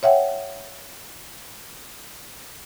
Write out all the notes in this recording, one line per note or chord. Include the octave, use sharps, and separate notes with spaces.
C#5 E5 F#5 G5